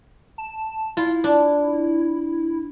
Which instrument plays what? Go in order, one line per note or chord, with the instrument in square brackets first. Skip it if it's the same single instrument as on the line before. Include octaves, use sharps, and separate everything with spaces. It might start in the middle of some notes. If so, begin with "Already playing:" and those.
[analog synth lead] A5
[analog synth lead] E4 [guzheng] F4
[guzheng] D4